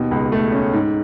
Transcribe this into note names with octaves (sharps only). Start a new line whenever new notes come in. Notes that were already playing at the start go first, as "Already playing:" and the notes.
Already playing: D#2 B2
C#2
A3
C#4
G#2